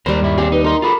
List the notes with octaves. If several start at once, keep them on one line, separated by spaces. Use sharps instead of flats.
D#2 G3 A#4 C5
G2 E4
C4 G4 G#4
D#4 B4
D#4 A#4 D#5 C6
F4 G#4 A4 B5